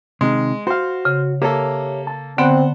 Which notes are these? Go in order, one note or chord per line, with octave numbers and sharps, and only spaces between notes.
C3 D#3 G#3
F#4 C5 F5
C#3
A#3 G4 A4 C#5 E5
A5
D3 B3 C4 C5 F#5